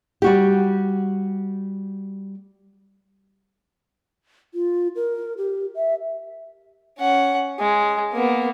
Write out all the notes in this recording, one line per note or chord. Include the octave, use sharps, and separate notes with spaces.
G3 F#4 G4
F4
A#4
G4
E5
C#4 F#5
G#3
A#3 B3